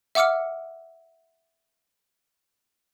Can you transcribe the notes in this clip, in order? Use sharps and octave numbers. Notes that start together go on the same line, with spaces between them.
E5 F#5 D6 E6 F6 C#7